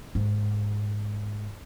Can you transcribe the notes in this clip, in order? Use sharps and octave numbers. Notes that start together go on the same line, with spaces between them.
G#2